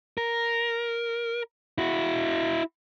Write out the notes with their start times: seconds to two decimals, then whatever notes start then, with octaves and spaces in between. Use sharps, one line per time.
0.18 A#4
1.78 E4 F#4